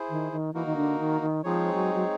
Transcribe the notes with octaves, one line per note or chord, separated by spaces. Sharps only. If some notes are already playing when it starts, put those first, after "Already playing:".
Already playing: E4 G#4 C5
D#3
D#3
E3 A#3 D#4 F#4 A#4
D#3
D3
D#3
D#3
F3 G#3 C4 D#4 G#4 C#5
F#3
F#3